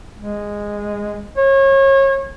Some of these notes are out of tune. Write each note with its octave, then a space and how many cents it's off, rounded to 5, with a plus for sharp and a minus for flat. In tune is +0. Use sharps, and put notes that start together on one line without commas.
G#3 -10
C#5 -30